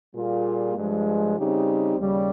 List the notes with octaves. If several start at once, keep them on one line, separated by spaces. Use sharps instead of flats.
A#2 G3 A#3 F4 G#4
G2 F3 G#3
C#3 G3 C4 D#4 G4
D#2 C#3 G3